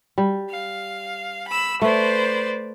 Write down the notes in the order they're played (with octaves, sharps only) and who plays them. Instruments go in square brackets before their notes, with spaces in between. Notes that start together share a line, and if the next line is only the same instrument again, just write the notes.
[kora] G3
[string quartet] F5
B5 E6
[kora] A3 [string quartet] B4 C5 D5